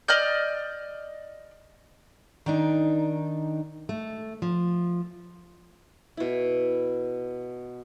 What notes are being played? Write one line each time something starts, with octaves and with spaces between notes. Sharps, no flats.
D5 D#5 F6 G6
D#3 D4 D#4
A3
F3
B2 E4